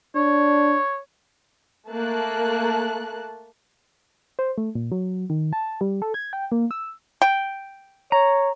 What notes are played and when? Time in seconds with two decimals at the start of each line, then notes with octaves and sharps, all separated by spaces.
0.15 D4 C#5
1.88 A3 A#3 A5 F#6
4.39 C5
4.58 A3
4.75 A#2
4.92 F#3
5.30 D#3
5.53 A5
5.81 G3
6.02 A4
6.14 G#6
6.33 G5
6.52 A#3
6.71 E6
7.22 G5
8.12 C#5 A#5